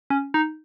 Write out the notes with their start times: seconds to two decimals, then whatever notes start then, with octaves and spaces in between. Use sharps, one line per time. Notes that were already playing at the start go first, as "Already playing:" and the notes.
0.10 C#4
0.34 D#4